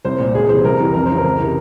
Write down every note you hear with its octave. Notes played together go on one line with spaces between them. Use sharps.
C2 C5
A#2
C#2 G#4
C3 E3 C5
C2 A#4
C3 E3
F2 A#4
C#3 E3 C5
A#4
C#2
C3 E3